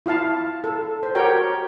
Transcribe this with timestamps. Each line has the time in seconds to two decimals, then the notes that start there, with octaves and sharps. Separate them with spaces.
0.06 E4 F4 F5 A5
0.64 A4
1.03 C5
1.15 F#4 G4 A#4 C#5 G5